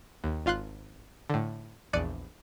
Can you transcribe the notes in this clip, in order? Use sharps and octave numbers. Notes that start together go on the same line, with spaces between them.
D#2
G#1 F4 F5 C6 F#6
A2 D3
A#1 E2 D5 F#6 C#7 D#7